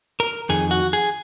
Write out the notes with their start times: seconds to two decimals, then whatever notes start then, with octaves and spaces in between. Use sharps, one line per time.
0.20 A#4
0.49 F2 D#3 G#4
0.71 F#4
0.93 G#4